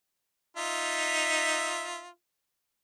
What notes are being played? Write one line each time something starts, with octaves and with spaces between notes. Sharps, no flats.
D#4 F4 E5